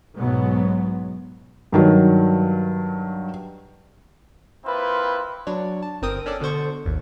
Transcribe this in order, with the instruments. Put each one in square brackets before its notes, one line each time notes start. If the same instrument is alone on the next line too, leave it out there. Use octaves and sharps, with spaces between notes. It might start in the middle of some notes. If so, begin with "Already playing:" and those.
[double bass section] B1 G#2 B2 F#3 B3
[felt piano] G2 D#3 F#3
[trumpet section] A#3 C4 E4 F4 B4 C5
[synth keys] F#3 D4 C#5 D5
A5
G1 C4 A#4 G5 D#6
C#4 D4 A4 D5
B2 D3 A4 C5 C#6
G#1 D#2